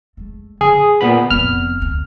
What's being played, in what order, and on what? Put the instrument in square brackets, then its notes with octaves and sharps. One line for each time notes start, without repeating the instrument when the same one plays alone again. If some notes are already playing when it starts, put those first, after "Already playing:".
[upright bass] G#3 A3
[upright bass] D3 [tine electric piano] G#4
[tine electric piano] A#2 B3 B5
[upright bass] F1 B3 [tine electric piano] F6
[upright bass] D2